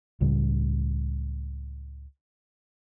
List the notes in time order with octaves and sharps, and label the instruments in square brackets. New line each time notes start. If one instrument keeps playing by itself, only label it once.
[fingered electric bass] C#2 A2 C#3 G3